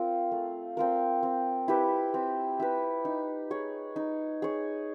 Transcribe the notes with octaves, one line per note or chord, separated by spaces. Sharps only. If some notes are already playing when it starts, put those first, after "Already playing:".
Already playing: C4 F4 A#4
A3
C4 F4 A#4
C4
E4 G4 B4
C4
E4 G4 B4
D#4
G#4 C#5
D#4
G#4 C#5